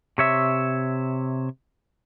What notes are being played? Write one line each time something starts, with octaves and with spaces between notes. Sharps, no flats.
C3 C#5 E5